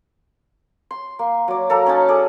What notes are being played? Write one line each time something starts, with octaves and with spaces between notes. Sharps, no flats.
C6
A#3
F#3 D5
A#3 A4 A#4 A#5
C#4 D#4 A5
G#4 A4 D5